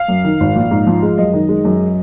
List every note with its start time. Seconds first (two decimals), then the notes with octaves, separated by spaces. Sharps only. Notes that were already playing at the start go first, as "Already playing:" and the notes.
Already playing: F5
0.08 F#2
0.24 D#3
0.40 G#1
0.56 A#1
0.71 G#2
0.87 F3
1.02 G#3
1.18 F#2 D#5
1.33 D#3
1.49 G#3
1.65 F#2